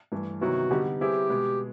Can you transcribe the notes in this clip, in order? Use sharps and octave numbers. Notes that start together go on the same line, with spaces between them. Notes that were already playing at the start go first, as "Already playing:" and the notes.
G2 E3 A3
C3 D#3 F#3 B3 E4 F#4
D3 G3 B3 D#4 G4
G3 C4 E4 G4 G#4 B4
B2 G#3 B3